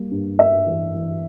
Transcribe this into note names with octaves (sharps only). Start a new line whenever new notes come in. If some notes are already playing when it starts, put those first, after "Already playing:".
Already playing: G3 A#3
G2
G2 E5
E3
E3